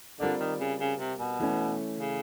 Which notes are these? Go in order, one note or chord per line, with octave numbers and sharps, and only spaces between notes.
D3 G3 C4 F4 A#4 D5
D#3
C#3
C#3
C3
B2
E3 A3 C#4
C#3